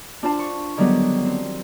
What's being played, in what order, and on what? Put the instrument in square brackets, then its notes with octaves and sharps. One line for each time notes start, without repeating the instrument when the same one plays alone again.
[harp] D4 F4 C5 A5
C#6
D3 D#3 F#3 G3 B3
C4